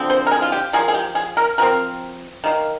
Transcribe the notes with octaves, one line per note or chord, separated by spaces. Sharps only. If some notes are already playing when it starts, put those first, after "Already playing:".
Already playing: D3 F3 C4
C5
A#4
G#4
F4
G4
F3 A#3 G#4
G#4
G4
G#4
A#4
F3 C4 A#4
D#3 A#3